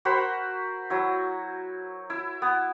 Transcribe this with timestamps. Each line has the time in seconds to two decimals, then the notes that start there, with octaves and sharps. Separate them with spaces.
0.05 F#4 A#4 C5 B5
0.90 F#3 E4
2.10 E4
2.42 B3